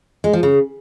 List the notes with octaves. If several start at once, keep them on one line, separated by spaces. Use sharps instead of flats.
G#3
F3
C#3